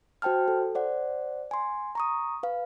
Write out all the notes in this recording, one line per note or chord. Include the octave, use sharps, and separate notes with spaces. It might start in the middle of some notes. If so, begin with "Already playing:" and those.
F#4 C5 G5 A5 F6
A4
C5 D5 F#5
G#5 C6
A#5 C#6 D#6
B4 F5